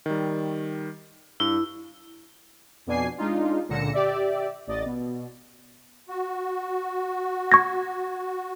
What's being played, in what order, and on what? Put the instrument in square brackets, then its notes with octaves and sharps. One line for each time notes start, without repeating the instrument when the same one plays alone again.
[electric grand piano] D#3 G3
[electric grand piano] G2 [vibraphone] E4
[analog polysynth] F2 B2 D4 G#5 C7
G#3 D4 D#4 F4
C#2 A#2 D3 A#6 C#7 E7
G4 D5 E5
A1 D5 D#5 A6
B2
[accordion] F#4
[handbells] C#6 G#6 A#6